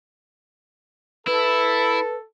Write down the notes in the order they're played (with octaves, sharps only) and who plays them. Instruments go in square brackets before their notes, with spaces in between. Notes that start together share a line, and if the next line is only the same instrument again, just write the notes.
[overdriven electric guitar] E4 [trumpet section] A4 [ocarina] B4